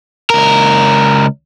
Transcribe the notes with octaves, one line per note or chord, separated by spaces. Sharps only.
C#2 A#4